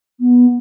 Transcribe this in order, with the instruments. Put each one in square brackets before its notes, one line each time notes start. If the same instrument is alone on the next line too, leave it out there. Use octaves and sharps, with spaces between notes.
[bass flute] B3